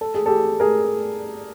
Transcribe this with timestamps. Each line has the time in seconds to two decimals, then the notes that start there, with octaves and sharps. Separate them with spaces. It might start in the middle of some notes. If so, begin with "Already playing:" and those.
0.01 A4
0.14 G#4
0.26 G4 A4
0.60 G#4 A#4